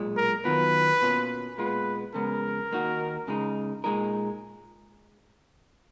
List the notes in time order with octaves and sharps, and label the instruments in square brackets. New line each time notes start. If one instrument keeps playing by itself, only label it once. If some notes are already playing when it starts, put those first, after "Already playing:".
Already playing: [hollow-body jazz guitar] B1 A#2 G#3
[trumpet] A#4
[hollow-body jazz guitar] D#2 D#3 F#3 B3 F4 [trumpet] B4
[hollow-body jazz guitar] B2 A#3 C#4 F4
[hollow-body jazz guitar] A#2 G#3 B3 F4 [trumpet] B4
[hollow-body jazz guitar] F2 C#3 G#3 B3 [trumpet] A#4
[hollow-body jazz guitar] D#2 D#3 A#3 D#4 F#4
C#2 C#3 G#3 D#4
A#2 G#3 D#4 A#4